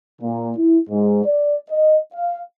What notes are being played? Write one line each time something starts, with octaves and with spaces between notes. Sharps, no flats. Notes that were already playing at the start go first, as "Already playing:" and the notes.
A#2
E4
G#2
D5
D#5
F5